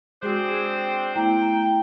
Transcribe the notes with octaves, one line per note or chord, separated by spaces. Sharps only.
G#3 C4 D4 F#4 G#4 C5
A3 B3 E4 G5 A#5